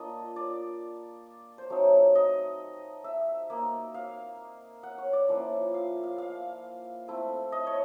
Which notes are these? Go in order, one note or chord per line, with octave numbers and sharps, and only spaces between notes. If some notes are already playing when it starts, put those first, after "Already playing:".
Already playing: A#3 D4 F4 D#5
D5
C5
F#3 A3 C4 D#4 C#5
D#5
E5
A#3 D#4
F5
F#5
C#5
D5
F3 A#3 C#4 E4
F5
F5
F5
A3 C4 E4
D#5
C#5